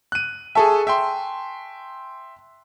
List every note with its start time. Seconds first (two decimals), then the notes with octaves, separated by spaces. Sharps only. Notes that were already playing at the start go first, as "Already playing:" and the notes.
0.12 F#6 D#7
0.55 G#4 A4 E5 G#5 A5 C#6
0.87 E5 G5 C6